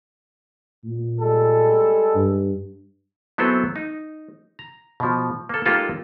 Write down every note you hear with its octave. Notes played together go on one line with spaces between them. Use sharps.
A#2
G3 G#3 A4
G2
F#3 B3 C4 E4 G#4 A4
D#4
A#5
B2 F3
A#3 A4
G#3 A#3 D#4 F4 G4 A4